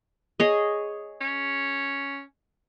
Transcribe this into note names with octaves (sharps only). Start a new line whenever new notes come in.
G#4 C#5 D#5
C#4